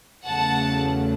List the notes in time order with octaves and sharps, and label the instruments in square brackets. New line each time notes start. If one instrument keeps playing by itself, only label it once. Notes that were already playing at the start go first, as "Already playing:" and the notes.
[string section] E2 C#3 F#3 A3 F#5 A5